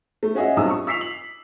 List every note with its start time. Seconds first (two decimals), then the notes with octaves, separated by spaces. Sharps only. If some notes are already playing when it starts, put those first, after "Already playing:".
0.23 A3
0.35 C#4 F#4 G#4 D#5 E5
0.56 B1 G2 C3 D#6 E6
0.69 C#6
0.87 E6 B6 C7 F7
1.01 F#7